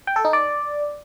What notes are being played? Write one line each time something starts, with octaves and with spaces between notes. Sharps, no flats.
G5
A4
D#4
D5